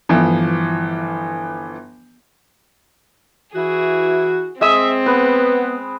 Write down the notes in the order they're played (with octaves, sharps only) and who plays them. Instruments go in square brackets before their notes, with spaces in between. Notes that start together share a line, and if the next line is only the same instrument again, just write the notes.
[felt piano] G1 E3 F3
[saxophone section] E3 E4 F#4 [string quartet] G#4
[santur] G#3 D#6 [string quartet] C4 [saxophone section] E5
[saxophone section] B3 [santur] B4